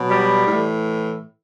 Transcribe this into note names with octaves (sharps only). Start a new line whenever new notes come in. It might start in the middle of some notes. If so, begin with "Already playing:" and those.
Already playing: B2 F#3
G3
A2 E3